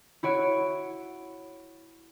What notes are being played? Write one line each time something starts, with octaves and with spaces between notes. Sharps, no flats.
E4 F#4 C#5 D7